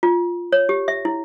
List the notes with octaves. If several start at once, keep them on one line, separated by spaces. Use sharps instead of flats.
F4
C#5
G4
E5
E4